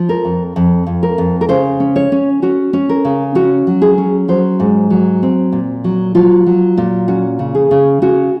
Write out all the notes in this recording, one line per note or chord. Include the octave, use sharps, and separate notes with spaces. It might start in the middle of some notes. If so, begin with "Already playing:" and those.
Already playing: F3
A#4
F2
F2
F2
A#4
F2
A#4
C#3 C5
C#4
C#5
C#4
C#4 F#4
C#4
A#4
C#3
C#4 F#4
F#3
G#4
C#4
F#3 C5
G#2
F#3
C4
A#2
F#3
F#3 F4
F#3
A#2
C#4 F#4
C#3
G#4
C#3
C#3 F#4